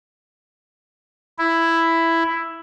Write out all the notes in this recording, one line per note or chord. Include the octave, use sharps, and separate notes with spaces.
E4